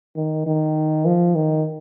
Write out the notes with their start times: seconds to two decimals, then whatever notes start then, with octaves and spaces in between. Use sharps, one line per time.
0.16 D#3
0.46 D#3
1.05 F3
1.35 D#3